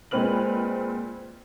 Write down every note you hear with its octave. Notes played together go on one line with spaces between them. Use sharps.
A#2 G#3 C4 B4 F6 F#7